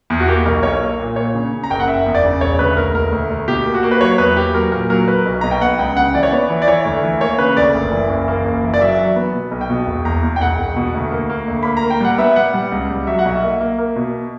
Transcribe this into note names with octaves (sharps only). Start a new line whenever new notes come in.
E2
F#4
A#3 G4
B1 A#4
B1 C#5
A#3
A#2
A#2 C#5
C#3
C#3
A#5
F#1 G5
F#5
F#1 E5
E2
D5
C#3
E1 C#5
D2 B4
E1 A#4
D2 A#4
D2
D2
B2 G4
A#3
F#4
A#3
B4
F#3 C#5
E2 B4
A#3 G4
F#3 A#4
A#2 A#4
F#3 A#4
F#3 B4
B1
B1 A#5
G5
B3 F#5
C#2 G5
C#3 F#5
E3 D5
C#5
B3 D5
E3
D5
E3 C#5
D2
E3
A#3 C#5
C#3 B4
D2 D5
F#1
E3
F#1
A#3
F#1
E3
D5
F#3 E5
F#3
B3
B2
B1
G5
B2
E1
E2 A#5
E2
G5
E1 F#5
E1
B2
D2
A#3
A#3
D2
A#3 B5
A#5
A#3
G5
G3 F#5
B3 E5
G3 F#5
G3
C#2
G3
F#3 E5
F#5
B1
E5
A#3
A#3
A#3
B2